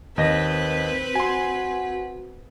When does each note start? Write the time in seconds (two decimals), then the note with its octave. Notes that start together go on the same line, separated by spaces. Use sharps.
0.18 D#2 C4 B4 D#5 A#6
1.15 F#4 G#5 C6